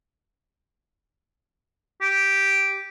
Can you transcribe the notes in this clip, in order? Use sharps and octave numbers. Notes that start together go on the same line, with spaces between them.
G4